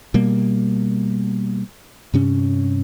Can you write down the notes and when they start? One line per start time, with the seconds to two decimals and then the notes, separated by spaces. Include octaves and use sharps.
0.14 B2 G3 A#3
2.14 G2 C3 C#4